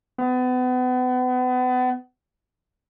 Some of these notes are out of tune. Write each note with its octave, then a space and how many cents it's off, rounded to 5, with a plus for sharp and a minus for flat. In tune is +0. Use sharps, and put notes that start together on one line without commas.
B3 +35